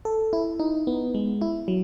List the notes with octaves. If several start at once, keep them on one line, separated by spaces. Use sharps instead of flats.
A4
E4
D#4
B3
G#3
E4
F#3